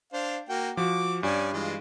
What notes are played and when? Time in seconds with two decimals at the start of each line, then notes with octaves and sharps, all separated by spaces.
0.13 D4 C5 F5
0.49 A#3 F#4 G5
0.77 F3 F#4 D6
1.23 G2 C#4 D5 G#5
1.53 E3 G#3 F4